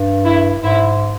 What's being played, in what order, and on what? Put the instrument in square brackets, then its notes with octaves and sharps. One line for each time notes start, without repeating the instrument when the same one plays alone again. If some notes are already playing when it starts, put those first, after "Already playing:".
Already playing: [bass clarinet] G2
[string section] E4
[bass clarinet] G#2 [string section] E4